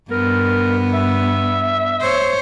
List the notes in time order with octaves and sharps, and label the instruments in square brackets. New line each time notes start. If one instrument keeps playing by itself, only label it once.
[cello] G2 B3 [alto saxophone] A#4
[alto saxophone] E5
[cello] C5 C#5